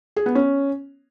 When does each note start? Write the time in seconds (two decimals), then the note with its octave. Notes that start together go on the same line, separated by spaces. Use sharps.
0.16 G#4
0.26 B3
0.35 C#4